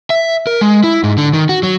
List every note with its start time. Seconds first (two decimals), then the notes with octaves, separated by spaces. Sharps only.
0.10 E5
0.47 A#4
0.61 G#3
0.84 E4
1.04 G#2
1.18 D3
1.33 D#3
1.49 F#4
1.63 F#3